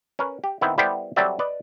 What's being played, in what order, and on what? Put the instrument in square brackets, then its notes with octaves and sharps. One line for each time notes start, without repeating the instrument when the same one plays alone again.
[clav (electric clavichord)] C#4 A#4 B4
G4
D#3 B3 C4 E4
G3 B3 E4 G4 A4 C5
F#3 G3 C4 A4 D5 E5
B4 D5 D#5